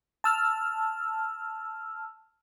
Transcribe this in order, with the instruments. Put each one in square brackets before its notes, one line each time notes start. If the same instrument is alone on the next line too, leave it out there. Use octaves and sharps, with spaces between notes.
[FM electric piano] A5 E6 F6